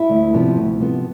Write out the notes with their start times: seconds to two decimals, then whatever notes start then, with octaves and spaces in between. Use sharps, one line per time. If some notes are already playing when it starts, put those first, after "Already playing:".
Already playing: E4
0.10 D2
0.33 C3 F3 B3
0.57 D2
0.80 C3 F3 B3